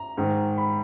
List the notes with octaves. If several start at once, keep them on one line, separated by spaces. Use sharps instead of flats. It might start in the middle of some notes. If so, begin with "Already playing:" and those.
Already playing: A#5
G#2 D#3
B5